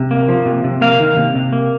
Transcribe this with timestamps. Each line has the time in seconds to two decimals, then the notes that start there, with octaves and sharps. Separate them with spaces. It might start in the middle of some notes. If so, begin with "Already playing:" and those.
Already playing: C3
0.11 A#3
0.28 F3
0.46 C3
0.64 C3
0.81 A#3 F5
1.00 D#3
1.17 C3
1.35 C3
1.53 A#3